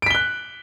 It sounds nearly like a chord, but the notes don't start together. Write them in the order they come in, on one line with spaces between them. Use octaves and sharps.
D7 B6 G7 F#6